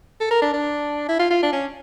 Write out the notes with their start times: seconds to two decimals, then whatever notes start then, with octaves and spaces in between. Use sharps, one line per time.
0.21 A4
0.31 A#4
0.42 D4
0.53 D4
1.09 E4
1.19 F4
1.30 F4
1.43 D4
1.53 C#4